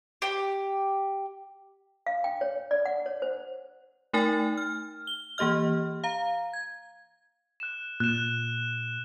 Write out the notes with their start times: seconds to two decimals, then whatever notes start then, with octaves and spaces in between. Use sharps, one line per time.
0.22 G4
2.06 F5
2.24 G5
2.41 C#5
2.71 D5
2.85 F#5
3.06 C#5
3.22 C5
4.13 A3 D#4 A#4 G5 G#5 A6
4.57 F6
5.07 G7
5.38 E3 A#3 G4 D#5 F6
6.04 F5 A#5
6.53 G#6
7.60 F#6 E7
8.00 A#2 F#6 E7